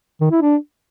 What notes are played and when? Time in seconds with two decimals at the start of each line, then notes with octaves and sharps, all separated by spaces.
0.21 D#3
0.31 E4
0.42 D4